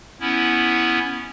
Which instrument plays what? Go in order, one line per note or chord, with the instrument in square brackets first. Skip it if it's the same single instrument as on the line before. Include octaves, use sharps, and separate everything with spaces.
[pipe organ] B3 C#4 E4